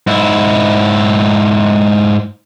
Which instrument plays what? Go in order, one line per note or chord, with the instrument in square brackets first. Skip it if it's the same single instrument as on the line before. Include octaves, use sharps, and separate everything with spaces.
[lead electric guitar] G#2 E4